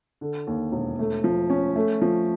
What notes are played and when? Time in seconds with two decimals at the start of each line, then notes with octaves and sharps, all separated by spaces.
0.21 D3
0.47 D#2
0.72 E1
0.99 A3
1.24 F3
1.50 C#4
1.76 A3
2.01 F3